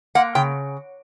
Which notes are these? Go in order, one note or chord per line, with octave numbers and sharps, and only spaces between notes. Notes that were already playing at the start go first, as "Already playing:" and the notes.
A#3 F#5
C#3 G5